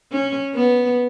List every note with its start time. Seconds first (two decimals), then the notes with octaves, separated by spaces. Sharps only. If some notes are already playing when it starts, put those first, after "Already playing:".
0.12 C#4
0.55 B3